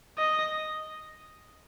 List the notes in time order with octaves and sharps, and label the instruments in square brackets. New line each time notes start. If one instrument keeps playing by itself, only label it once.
[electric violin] D#5